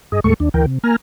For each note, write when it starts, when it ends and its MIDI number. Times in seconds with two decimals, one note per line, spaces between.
0.12 0.20 43
0.12 0.20 68
0.12 0.20 75
0.24 0.34 39
0.24 0.34 45
0.24 0.34 56
0.24 0.34 57
0.24 0.34 69
0.24 0.34 85
0.40 0.49 39
0.40 0.49 62
0.54 0.66 38
0.54 0.66 52
0.54 0.66 70
0.54 0.66 79
0.66 0.78 48
0.83 0.96 58
0.83 0.96 80
0.83 0.96 82
0.83 0.96 89